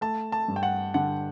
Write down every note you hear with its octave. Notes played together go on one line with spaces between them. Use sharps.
A3 A5
A5
G2
G5
F#5
D3 F#5